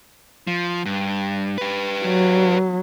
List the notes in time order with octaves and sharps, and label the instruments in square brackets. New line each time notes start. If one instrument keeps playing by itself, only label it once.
[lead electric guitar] F3
G2
G4 B4
[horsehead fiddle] F#3